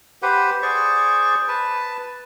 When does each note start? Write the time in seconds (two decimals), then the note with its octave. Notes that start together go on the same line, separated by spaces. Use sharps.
0.22 G4 B4 C5 F#5
0.62 G#4 C5 D5 C#6
1.48 B4 A5